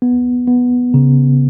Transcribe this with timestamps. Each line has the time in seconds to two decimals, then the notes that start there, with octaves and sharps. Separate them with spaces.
0.02 B3
0.48 B3
0.94 C#3